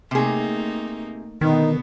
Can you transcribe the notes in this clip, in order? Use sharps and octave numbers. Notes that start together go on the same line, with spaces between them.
C3 A3 A#3 D#4 G#4
B2 D3 D#3 B3 D#4